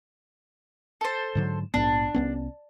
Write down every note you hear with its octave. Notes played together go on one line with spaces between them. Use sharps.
A4 C5
G#2 D3 F#3
A#1 G#2 B3 D4
C2 B3 C#4